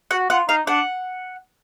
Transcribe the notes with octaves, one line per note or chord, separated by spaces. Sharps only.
F#4 F#5
F4 F#5
D#4 F5
D4 F#5